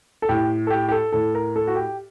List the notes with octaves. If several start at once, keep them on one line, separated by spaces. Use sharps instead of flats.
A4
A2 G4
A4
G4
G4
A4
A2 A4
A#4
A4
F#4
G4